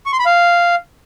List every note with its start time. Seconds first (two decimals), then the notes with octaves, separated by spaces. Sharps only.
0.06 C#6
0.13 C6
0.19 B5
0.26 F5